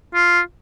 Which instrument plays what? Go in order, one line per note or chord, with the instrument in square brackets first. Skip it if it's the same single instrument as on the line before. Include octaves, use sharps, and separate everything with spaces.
[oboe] F4